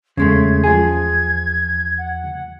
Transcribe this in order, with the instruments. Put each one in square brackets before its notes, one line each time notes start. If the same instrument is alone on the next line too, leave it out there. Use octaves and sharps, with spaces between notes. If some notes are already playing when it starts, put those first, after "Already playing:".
[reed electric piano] E2 [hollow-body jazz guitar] C#3 G#3 A3 [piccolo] G#6
[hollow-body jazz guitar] F3 G#4 [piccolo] G#6
[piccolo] F#5